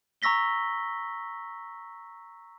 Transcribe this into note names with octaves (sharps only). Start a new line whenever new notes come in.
A#5 C#6 E6 A#6 B6 G7